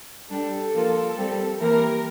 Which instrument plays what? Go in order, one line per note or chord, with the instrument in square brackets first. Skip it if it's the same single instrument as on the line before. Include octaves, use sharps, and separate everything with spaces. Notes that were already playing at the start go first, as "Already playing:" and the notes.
[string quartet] G3 D4 G4 [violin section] A4
[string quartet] F3 A#3 F4
G3 C4 G4
[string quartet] E3 A#3 E4 G4 [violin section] A#4